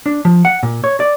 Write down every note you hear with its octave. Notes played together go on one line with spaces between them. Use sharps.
D4
F3
F#5
A#2
C#5
D5